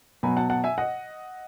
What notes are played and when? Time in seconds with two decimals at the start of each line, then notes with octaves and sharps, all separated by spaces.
0.23 B2 F#3 G#5 B5
0.37 F#5 A5
0.50 F#5 A5
0.64 E5 G#5
0.78 D#5 F#5